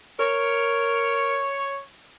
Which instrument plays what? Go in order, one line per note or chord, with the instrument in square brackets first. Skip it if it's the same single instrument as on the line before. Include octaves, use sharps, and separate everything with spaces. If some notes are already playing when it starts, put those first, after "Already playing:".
[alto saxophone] A#4 [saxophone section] C#5